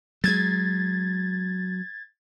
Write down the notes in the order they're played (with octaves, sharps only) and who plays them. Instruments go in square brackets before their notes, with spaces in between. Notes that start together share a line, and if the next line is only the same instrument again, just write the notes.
[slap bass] F#3 G#3 [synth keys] G#6 A6